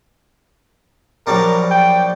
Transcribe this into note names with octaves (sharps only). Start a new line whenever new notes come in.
A#1 F#3 G3 A#4
G5